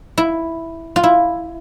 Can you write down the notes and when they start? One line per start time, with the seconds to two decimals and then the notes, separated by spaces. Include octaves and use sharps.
0.18 E4
0.96 F4
1.03 E4